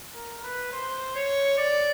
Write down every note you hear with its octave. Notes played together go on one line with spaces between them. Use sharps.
A#4
B4
C5
C#5
D5